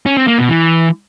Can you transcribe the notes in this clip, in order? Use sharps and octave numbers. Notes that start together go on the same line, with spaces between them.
C#4
C4
A#3
B2
E3